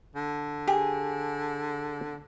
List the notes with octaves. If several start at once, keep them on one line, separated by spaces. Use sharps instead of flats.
D3
G4 G#4